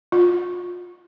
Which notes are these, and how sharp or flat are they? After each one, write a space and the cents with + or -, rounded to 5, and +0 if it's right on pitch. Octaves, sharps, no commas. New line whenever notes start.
F4 +25